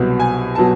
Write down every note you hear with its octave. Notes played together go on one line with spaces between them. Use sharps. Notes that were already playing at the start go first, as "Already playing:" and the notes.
Already playing: C2 B2 F#3
G#5
B2 F#3 A5